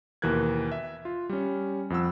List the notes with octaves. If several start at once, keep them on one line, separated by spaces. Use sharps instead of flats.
D#2 B2 E3 A#4 F#6 G#6
E5
F4
G3 C#4
F2 F3 F#5 E6